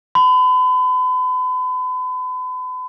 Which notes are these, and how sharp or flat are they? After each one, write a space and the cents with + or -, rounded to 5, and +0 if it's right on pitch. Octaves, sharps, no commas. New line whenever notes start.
B5 +40